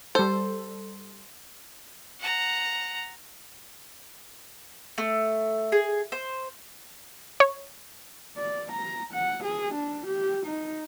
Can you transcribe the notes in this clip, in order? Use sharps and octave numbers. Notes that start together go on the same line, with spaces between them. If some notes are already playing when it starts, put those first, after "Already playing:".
G3 A4 C5
F#5 A#5
A3
G#4
C5
C#5
D5
A#5
F#5
G#4
D4
G4
D#4